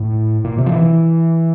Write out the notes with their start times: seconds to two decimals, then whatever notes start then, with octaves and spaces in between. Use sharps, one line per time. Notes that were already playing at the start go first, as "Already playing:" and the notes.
Already playing: A2
0.44 A#2
0.58 C3
0.66 F3
0.72 E3